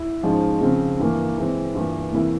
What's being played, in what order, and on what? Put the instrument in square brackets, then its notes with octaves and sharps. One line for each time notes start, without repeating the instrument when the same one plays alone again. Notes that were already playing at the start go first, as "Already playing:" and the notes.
Already playing: [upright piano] E4
G#2 F3 G#3 C#4
C#3 F3 C4
G2 E3 A#3
E3 G#3 C4
G2 E3 A#3 F4
E2 C3 E3 A#3 E4